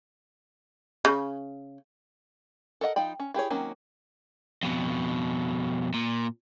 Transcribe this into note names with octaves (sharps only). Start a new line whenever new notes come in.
C#3
A4 A#4 D#5 F#5
F3 D#4 G5 B5
C#4
E4 G4 G#4 C#5
D#3 F#3 A#3 C4 C#4
F2 B2
A#2